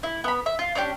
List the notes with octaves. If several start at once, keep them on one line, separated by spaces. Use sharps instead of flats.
E4
B3 B5
E5
F4
C#4 D4 E4 G4